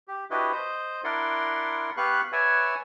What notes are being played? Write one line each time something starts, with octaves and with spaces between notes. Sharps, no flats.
G4
D4 E4 F#4 G4 B4 D#5
C5 D#5
D4 E4 A#4 D5 F#5 C6
B3 G4 B4 F5 C#6 F#6
B4 C#5 D5 E5 F#5 G#5